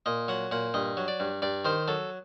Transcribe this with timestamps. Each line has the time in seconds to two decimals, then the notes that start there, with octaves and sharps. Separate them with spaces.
0.06 A#2 D#5
0.28 F#3 F#5
0.52 A#2 F#5
0.74 G2 D#5
0.97 F#3
1.08 D5
1.20 G2
1.42 G2 D5
1.65 D#3 C5
1.88 F#3 A4